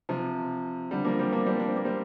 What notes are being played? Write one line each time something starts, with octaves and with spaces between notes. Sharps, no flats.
C3 F3
D3 G3
F3 A#3
G3 C4
A#3 D4
G3 C4
D4
C4
A#3
G3 C4